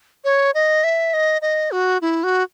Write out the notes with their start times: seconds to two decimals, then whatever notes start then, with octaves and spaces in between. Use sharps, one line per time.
0.24 C#5
0.54 D#5
0.84 E5
1.14 D#5
1.42 D#5
1.72 F#4
2.02 E4
2.24 F#4